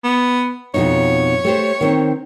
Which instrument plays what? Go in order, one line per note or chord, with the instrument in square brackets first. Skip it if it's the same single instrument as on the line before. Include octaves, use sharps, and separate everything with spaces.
[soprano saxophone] B3
[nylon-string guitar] F2 B2 D#4 [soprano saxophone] C#5
[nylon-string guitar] A3 G4 C5
D#3 C4